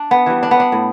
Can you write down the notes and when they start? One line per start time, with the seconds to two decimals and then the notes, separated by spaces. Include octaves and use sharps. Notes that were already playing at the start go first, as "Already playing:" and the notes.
Already playing: D4
0.11 B3
0.26 E3 G3
0.43 D4
0.51 B3
0.60 D4
0.72 A2